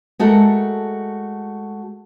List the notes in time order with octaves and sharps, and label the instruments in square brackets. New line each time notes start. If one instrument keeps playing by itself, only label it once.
[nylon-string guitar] G#3 A3 F#4 A4 A#4